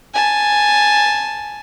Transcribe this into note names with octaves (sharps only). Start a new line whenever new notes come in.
G#5 A5